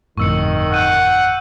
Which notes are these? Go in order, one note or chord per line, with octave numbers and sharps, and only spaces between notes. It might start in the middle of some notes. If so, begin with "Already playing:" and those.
G1 F2 A2 D#3 C#6 E6 C#7
F#5 E6 G6 D#7